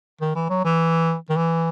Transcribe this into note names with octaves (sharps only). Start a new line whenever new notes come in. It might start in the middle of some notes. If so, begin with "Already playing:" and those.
D#3
E3
F#3
E3
D#3
E3